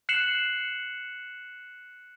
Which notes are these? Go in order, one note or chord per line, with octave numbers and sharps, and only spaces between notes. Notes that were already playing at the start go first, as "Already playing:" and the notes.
F#6 C7 C#7 E7 F#7